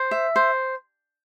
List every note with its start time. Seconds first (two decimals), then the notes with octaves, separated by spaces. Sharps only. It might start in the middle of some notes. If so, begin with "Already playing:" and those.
Already playing: C5
0.11 E5
0.36 C5